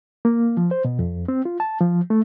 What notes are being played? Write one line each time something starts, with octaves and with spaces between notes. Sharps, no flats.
A#3
F3
C5
B2
F2
C4
F4
A5
F3
A3